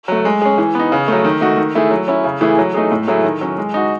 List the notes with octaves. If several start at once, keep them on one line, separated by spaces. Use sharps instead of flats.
F#3 A3
G#3
C#4 G#4
E3
B3 D#4
C#3
F#3 A3
D#3
A3 D#4 F#4
D#3
A3 E4 G#4
F#3
C#4 E4
C#3
E3 A3 E4 G#4
F#3
A3 D#4 G#4
A2
F#3 A3 E4 G#4
D#3
F#3 C#4
G#3
D#4 F#4